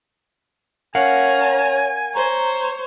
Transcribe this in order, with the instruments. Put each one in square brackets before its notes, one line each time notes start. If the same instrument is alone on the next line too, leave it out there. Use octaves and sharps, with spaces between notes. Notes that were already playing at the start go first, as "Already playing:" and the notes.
[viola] C#4 A#5 [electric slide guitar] A#4 F5 F#5 [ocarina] C#5 [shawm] G#5
[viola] C5 C#5 [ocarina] A#5